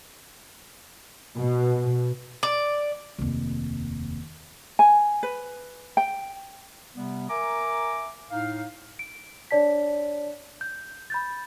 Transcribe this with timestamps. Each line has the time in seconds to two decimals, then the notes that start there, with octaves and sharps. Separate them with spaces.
1.37 B2
2.43 D5
3.18 F1 D#2
4.79 G#5
5.23 B4
5.97 G5
6.95 C3 G3 B3
7.29 A#4 E5 G#5 A#5 D6
8.31 A2 D#4 F5
8.99 D7
9.51 D4 C#5 D5 A5 B6
10.61 G6
11.10 B5 G6 A6